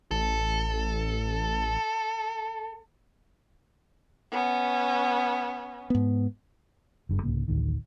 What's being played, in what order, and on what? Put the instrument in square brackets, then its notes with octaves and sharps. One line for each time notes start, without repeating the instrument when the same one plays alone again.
[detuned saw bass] A1 [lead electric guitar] A4
[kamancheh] B3 C#4
[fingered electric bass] G#2 B3
F#1 G2
C2 G#2 C#3 A#3
A1 D2 A2 D#3